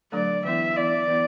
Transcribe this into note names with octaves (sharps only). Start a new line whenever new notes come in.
D3 F#3 A3 D4 A4 D5
E3 B3 E4 E5
E3 B3 E4 D5
E3 B3 E4